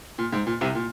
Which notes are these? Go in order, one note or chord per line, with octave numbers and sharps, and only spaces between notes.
A#2
G#2
A#2
C2 C3
A#2